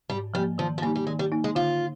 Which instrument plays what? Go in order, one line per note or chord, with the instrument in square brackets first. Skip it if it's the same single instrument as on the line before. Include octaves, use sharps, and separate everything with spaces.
[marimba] G#2 [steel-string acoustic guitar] G3
[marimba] F3 [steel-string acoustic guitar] G3
[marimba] A#3
[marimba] D#3 [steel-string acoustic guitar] F3
[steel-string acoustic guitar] F3
[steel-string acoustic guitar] G3 [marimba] A#3
[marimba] D#4
[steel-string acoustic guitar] G3
[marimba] D#3 [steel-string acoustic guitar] G#3
[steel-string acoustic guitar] G3
[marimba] A#3 D#4
[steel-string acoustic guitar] G#3
[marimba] D3 [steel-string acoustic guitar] F4